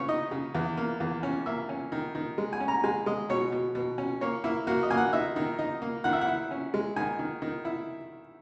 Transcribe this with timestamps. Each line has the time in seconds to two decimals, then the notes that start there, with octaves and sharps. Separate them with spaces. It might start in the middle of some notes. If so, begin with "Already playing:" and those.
Already playing: C#3 B4 C#5
0.08 D#4 D#5
0.31 C#3
0.55 E2
0.77 A#3
1.00 E2
1.23 C#4
1.46 A#3 E5
1.69 C#4
1.92 D#3
2.15 D#3
2.38 G#3
2.53 G#5
2.60 C#4
2.68 A#5
2.84 G#3 G#5
3.06 G#3 D#5
3.29 B2 C#5
3.52 B2
3.75 B2
3.98 C#4
4.21 A#3 C#5
4.44 A#3 E4
4.67 A#3 F#4
4.83 D#5
4.90 A#3 G#5
4.98 F#5
5.13 D#4 E5
5.36 D#3
5.59 D#4
5.82 A#3
6.04 D#3 F#5
6.13 E5
6.21 F#5
6.27 E4
6.51 C#4
6.74 G#3
6.96 D#3 G#5
7.19 D#3
7.42 D#3
7.65 E4